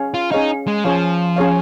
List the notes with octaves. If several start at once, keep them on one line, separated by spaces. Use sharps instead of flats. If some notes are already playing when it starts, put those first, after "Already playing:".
Already playing: C#4 G#4 C#5 F5
F4
C#4 D#4 G#4 C#5 F5
G#3
F3 C#4 G#4 C#5 F5
C#4 G#4 C#5 F5